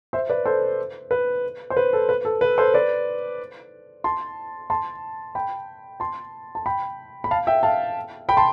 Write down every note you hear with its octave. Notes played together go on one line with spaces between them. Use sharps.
C5 E5
B4 D5
A4 C5
B4
C5
B4
A4
B4
A4
B4
A4 C5
B4 D5
A5 C6
A5 C6
G5 B5
A5 C6
A5
G5 B5
B5
F5 A5
E5 G5
F5 A5
G5 B5
A5 C6